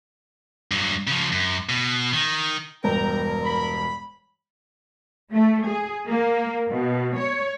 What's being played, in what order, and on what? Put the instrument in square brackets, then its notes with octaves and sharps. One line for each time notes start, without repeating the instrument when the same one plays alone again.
[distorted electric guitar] G2 F#3
C#3 F3
F#2
B2
D#3
[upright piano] E1 G2 [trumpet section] D#4 G5 A#5 [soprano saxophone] A#4
[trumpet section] B5
[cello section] A3
G#4
A#3
B2
C#5